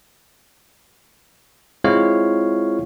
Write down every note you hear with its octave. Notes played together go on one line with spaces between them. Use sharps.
G#3 C4 E4 F4 C#5 F5